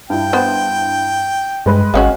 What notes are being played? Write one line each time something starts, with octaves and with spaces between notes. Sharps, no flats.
G2 E4 G5
B3 C5
G2 G#3 B4
G#1 G#3 C#4 F#4 F5